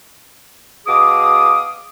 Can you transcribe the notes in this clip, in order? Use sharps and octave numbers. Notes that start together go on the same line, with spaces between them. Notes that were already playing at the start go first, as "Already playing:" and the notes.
B2 G#4 F5 D6 D#6